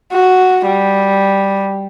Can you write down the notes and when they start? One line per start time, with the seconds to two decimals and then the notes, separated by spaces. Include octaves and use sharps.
0.13 F#4
0.66 G3